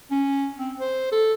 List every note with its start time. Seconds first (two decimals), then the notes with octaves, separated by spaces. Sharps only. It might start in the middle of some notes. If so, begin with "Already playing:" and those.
0.11 C#4
0.59 C4
0.80 C5
1.11 A4